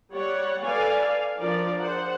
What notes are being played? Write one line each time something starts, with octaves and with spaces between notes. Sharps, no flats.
G3 C#5 D5 F#5
A4 B4 D5 F5 G#5
F5
F3 D4 A#4 D5
G#4 C5 F#5